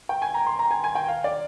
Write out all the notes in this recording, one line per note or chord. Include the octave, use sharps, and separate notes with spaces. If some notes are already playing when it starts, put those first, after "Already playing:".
G5
G#5
A#5
C6
A#5
G#5
G#5
G5
F5
D5